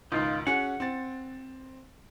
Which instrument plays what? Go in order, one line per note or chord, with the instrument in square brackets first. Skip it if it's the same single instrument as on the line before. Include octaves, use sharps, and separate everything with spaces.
[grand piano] C#2 G#2 D#3 [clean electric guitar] D#4 F4
[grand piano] C#4 F#4 G#4 [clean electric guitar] F#5
[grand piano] C4 A6